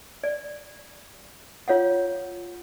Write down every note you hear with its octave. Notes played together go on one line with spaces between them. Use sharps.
D5
F4 C#5 F5 F#5